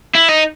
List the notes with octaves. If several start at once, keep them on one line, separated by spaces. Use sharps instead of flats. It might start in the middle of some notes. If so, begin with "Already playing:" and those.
E4
D#4